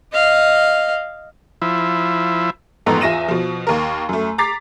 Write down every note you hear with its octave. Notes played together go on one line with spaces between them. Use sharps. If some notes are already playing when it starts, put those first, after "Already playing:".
D#5 F5
F3 E4
A1 F2 G#2 B3 A4 A#5
E2 F4 E5 A#6 D#7 E7
B2 F3
D#2 A#4
F#2 A3
A#5 D6 A6 B6 C7